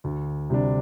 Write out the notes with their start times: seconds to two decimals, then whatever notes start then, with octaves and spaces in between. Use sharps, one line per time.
0.04 D2
0.50 C3 G3 D4